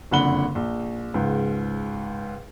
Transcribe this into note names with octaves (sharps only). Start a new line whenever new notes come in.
F#1 F2 D3 F#5 B5 G7
A#1
C#2 G#2